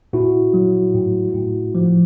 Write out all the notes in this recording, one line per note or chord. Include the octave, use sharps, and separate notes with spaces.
A#2 E4 F#4
F#3
A2
A2
F3